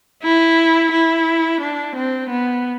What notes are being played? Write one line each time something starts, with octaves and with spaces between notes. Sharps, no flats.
E4
E4
D4
C4
B3